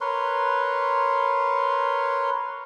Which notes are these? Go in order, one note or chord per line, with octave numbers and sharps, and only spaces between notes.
A#4 B4 C#5 C6